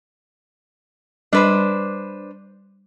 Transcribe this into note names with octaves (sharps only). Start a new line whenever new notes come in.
G3 D4 B4 C5